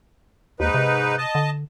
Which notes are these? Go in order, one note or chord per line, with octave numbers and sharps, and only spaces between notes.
D#2 G#2 D#4 B4
C3
D#5 A5
D3